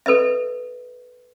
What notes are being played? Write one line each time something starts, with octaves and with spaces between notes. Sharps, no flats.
A4 B4 D#5 E5